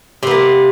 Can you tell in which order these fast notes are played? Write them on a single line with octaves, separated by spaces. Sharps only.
C3 B3 A#3